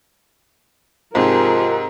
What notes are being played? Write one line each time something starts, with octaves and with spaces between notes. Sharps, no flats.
G#2 C3 F3 G4 G#4 A#4